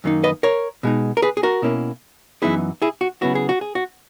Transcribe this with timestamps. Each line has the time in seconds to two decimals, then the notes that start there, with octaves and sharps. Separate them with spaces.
0.04 F#2 D#3 A#3 D#4
0.24 B4 D#5
0.43 A#4 C#5
0.83 B2 G#3 D#4
1.17 A#4
1.22 G#4 B4
1.37 G#4
1.43 F#4 A#4
1.62 B2 A#3 C#4 E4
2.42 F#2 E3 B3 D#4 E4 G#4
2.82 E4 G#4
3.01 F#4
3.21 C#3 F#3 B3 E4 F#4
3.35 G#4
3.49 F#4
3.61 G#4
3.75 F#4